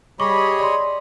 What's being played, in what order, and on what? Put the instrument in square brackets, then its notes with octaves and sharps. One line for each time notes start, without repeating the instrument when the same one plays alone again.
[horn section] G3 B5 [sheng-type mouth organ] G#4 C#5 D#5 [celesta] C#6 D6
[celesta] D5 C6